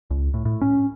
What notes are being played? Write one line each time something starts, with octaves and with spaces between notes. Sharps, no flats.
C#2
A2
A2
C#4